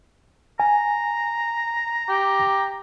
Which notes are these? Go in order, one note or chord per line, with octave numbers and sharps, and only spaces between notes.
G#5 A#5
G4